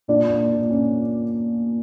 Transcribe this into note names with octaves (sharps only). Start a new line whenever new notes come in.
A#2 D4 D5
A#3
A#2
C#4